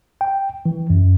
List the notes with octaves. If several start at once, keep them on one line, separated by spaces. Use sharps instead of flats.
G5
E3
F#2